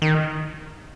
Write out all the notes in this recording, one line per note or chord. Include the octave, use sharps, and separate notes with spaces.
D#3